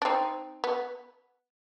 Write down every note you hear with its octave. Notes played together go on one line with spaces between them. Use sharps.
D4
C4 D#4
B3